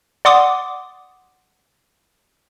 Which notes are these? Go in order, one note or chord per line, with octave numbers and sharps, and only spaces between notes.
D5 F#5 C6 D6 D#6